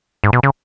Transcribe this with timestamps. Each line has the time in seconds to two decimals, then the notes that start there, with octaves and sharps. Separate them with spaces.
0.24 G#2
0.33 B2
0.43 C#3